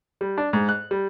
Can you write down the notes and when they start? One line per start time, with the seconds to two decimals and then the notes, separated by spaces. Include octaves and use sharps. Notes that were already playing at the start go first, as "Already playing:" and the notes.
0.21 G3
0.38 D4
0.53 G#2
0.69 F#6
0.91 G3